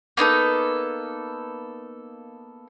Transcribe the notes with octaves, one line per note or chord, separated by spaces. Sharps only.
A#3 B3 D#4 A4